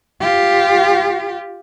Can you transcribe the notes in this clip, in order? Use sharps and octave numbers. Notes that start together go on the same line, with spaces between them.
F4 G4